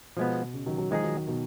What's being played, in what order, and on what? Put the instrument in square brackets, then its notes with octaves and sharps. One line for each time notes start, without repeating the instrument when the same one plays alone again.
[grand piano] B2 [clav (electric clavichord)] F3 G#3 B3
[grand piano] C#3
D#3 F#3
D#3 F#3
[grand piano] D#3 F#3 [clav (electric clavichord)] F3 G#3 D#4 G#4
[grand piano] D#3 F#3
B2 D#3